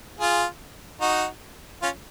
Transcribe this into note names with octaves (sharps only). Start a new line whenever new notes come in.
F4 G#4
D#4 F#4
C#4 F4